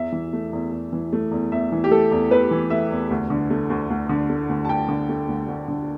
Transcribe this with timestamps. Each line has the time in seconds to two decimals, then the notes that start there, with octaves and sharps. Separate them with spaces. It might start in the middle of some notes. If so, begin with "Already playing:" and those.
Already playing: E2 E5
0.12 E3
0.33 A3
0.53 E2
0.72 E2
0.93 E3
1.13 A3
1.31 E2
1.51 E2 E5
1.72 E3
1.84 G4
1.91 A3 A4
2.11 E2
2.31 E2 B4
2.51 E3
2.70 A3 E5
2.90 E2
3.11 D2
3.30 D3
3.50 A3
3.70 D2
3.90 D2
4.09 D3
4.29 A3
4.49 D2
4.65 A5
4.69 D2 G5
4.89 D3
5.09 A3
5.29 D2
5.48 D2
5.68 D3